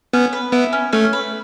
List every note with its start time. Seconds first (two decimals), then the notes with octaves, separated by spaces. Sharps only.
0.13 B3 C#4
0.33 B4
0.52 B3 E4
0.73 C#4
0.93 A3 C#4
1.13 B4